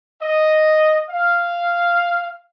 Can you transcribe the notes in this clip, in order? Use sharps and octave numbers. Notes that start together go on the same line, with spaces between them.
D#5
F5